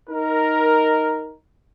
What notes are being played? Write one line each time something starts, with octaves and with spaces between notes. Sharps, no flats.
D#4 A#4